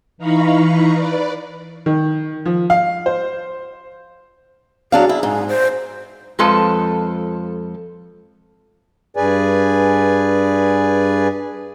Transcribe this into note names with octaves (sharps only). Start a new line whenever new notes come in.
E3 D#4 F5 A#5 B5 C#6
B4 D5
D#3
F3
F5
C5
F#3 D4 G#4 F5
E4
G#2
C5
F2 F3 G#3 A4 B4 A5
G2 G#4 B4 D5 G#5